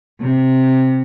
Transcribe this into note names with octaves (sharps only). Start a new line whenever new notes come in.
C3